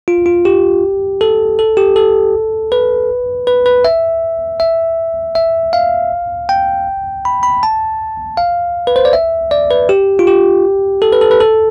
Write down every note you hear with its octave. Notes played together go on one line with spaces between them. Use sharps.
F4
F4
G4
A4
A4
G4
A4
B4
B4
B4
E5
E5
E5
F5
G5
B5
B5
A5
F5
B4
C5
D5
E5
D5
B4
G4
F4
G4
A4
B4
A4
B4
A4